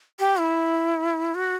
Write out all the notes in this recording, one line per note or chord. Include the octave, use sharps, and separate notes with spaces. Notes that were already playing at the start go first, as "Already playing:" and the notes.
G4
E4
F#4